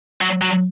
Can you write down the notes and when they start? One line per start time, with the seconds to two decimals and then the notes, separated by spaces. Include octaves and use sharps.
0.21 F#3
0.42 F#3